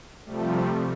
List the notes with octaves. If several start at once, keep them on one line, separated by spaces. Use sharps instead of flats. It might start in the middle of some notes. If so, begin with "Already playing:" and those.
C3 F3 G3 A3